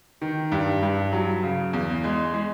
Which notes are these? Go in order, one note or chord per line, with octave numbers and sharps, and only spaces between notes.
D#3
G2
G2
F#3
C#3
E2
G#3
G#3